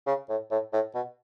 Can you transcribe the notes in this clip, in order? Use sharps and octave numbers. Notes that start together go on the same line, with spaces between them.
C#3
A2
A2
A2
B2